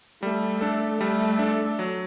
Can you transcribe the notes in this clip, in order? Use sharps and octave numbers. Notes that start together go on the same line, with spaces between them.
G3 A3
A3 D4 A4
G3 A3
D4 A4
F#3